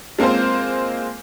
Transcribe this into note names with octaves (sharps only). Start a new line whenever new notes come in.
G#3 A#3 C4 F4 C5